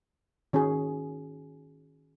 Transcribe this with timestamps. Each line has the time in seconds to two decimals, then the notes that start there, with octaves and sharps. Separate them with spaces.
0.53 D#3 C#4 F#4 G#4